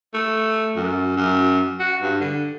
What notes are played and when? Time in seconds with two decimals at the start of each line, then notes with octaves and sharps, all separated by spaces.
0.14 A3
0.76 F#2
1.16 F#2
1.80 F#4
2.02 G2
2.21 D3